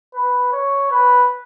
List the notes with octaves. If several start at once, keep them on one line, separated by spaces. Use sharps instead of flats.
B4
C#5
B4